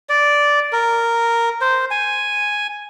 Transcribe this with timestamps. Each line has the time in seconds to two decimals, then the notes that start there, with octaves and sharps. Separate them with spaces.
0.09 D5
0.73 A#4
1.61 C5
1.91 G#5